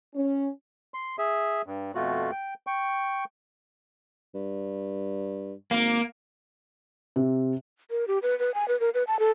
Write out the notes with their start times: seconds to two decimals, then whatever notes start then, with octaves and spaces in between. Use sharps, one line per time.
0.15 C#4
0.94 C6
1.18 G#4 E5
1.66 G2
1.95 F2 B2 A3 F4 F#4
2.32 G5
2.67 G5 C#6
4.35 G2
5.71 G#1 A#3
7.16 C3
7.91 A#4
8.08 G4
8.23 B4
8.39 B4
8.54 G#5
8.68 B4
8.80 A#4
8.94 B4
9.07 A5
9.19 A4